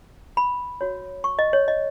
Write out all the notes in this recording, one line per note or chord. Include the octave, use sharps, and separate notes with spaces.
B5
F#4 C#5
C#6
D#5
C#5
D#5